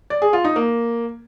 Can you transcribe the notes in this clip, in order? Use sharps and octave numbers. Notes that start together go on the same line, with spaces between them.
D5
G#4
F4
D#4
A#3